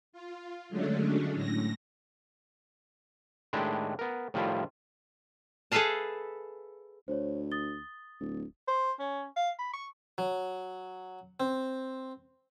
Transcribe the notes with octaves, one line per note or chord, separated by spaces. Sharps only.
F4
D3 F#3 G#3 A3 C#4 D4
A2 A#6
A2 D#3 G#3 D4 E4 G4
B3 A#4
A2 D#3 F3 G3 E4 F4
G#4 A4 B4 E5 F5 A5
D2 C5 C#5
D#6 A6 G7
D1
C5
C#4
F5
B5
C#6
F#3
C4